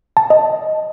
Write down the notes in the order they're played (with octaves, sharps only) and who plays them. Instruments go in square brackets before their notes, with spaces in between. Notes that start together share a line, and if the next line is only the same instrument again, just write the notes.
[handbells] A5
D#5